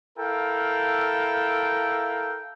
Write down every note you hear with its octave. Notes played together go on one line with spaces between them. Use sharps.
E4 A4 A#4 F5 G5